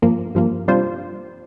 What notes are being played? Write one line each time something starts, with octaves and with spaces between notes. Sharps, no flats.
G2 F3 A#3
G2 F3 A#3
C3 G3 D4 F4 C5